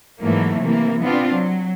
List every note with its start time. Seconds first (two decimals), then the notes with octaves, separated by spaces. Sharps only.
0.21 G#2 E3 F#3 A3 A#3
0.60 C3 E3 A#3
1.02 B3 C4 D4 F4
1.34 F#3